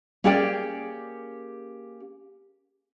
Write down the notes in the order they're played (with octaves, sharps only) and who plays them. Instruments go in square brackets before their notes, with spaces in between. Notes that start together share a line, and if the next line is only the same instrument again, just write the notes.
[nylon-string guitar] A#3 C#4 G4 G#4 D5 G5